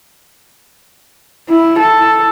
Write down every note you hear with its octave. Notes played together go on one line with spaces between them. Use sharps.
E4
A4